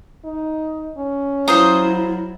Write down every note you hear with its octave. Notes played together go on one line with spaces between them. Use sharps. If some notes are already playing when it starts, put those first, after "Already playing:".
D#4
C#4
F#3 E4 F4 C5 A#5 D#6